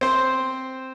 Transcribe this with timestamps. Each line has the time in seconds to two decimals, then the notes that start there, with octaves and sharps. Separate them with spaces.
0.01 C4 C5